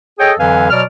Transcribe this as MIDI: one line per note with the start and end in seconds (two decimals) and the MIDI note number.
0.18 0.32 68
0.18 0.32 69
0.18 0.32 73
0.18 0.32 75
0.18 0.32 79
0.39 0.67 41
0.39 0.67 50
0.39 0.67 52
0.39 0.67 54
0.39 0.67 77
0.39 0.67 80
0.70 0.81 47
0.70 0.81 54
0.70 0.81 74
0.70 0.81 89